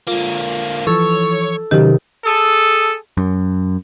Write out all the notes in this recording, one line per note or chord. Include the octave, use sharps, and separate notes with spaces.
D3 A#3 F4
E3 F3 A4 C#5
C3 D#3 F#3 C#4 D#4 G4
G#4 A4
F#2